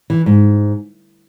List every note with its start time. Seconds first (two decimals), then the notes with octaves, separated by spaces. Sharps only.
0.10 E3
0.26 G#2